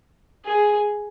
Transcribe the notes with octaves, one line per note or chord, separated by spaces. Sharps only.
G#4